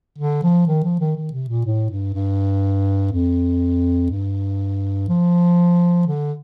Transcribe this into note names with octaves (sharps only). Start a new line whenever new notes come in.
D3
F3
D#3
F3
D#3
D#3
C3
A#2
A2
G2
G2
F2
G2
F3
D3